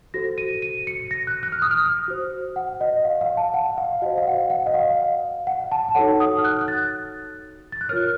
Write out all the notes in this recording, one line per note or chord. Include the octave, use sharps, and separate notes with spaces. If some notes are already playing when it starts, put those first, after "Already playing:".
F#4 A4 C5 A#6
D#7
D#7
C#7
A#6
F#6
F#6
F6
D#6
F6
F#4 C5
F#5
D#5
F5
F5
A5
F#5
F5
F#4 C5 D#5
F5
F#5
F5
F#5
D#5
F5
F#5
A5
A5
D#4 F#4 A4 C#5 F#5
D#6
F6
F#6
F#6
A6
A6
F#6
F4 A#4 C#5 F6